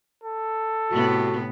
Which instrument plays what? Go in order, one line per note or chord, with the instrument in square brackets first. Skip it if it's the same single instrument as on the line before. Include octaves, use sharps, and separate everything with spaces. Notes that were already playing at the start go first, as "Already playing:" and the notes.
[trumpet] A4
[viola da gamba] A2 C3 B3 [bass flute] F#4